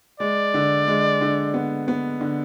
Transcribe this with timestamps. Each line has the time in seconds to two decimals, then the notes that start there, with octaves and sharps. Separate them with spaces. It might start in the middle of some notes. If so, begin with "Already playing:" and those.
0.20 G#3 D5
0.54 D3
0.87 G#3
1.21 D3
1.54 B3
1.88 B3
2.21 D3